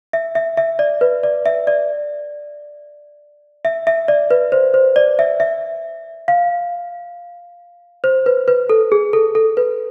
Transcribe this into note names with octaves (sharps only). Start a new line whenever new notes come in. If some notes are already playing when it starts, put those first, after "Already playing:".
E5
E5
E5
D5
B4
D5
E5
D5
E5
E5
D5
B4
C5
C5
D5
E5
E5
F5
C5
B4
B4
A4
G#4
A4
A4
B4